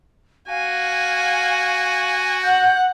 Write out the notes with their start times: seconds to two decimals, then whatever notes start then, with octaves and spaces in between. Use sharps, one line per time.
0.49 F#4 F5 G#5
2.43 F#5 G6